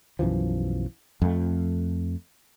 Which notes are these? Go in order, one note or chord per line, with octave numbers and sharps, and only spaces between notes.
B1 F#2 E3 F3
F2 A3